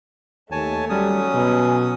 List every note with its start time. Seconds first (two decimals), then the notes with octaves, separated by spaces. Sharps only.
0.52 D#2 A3 C#5 G#5 A5
0.90 F#3 G3 C#4 D#6
1.34 B2 G#5